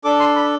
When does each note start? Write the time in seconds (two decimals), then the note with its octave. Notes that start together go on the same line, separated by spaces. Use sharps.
0.04 D4 A4 D6
0.20 C6
0.36 B5